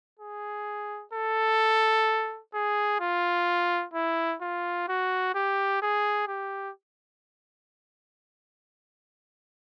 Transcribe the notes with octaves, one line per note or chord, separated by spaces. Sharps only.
G#4
A4
G#4
F4
E4
F4
F#4
G4
G#4
G4